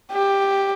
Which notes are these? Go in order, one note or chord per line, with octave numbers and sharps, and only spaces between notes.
G4